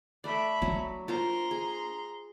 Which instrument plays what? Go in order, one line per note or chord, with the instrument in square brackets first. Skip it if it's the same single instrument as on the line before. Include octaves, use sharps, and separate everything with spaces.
[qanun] A3 D5 [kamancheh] E5 B5
[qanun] F#3 [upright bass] A#3 D4
[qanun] F4 A#4 C5 [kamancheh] A#5 C6
[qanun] G#4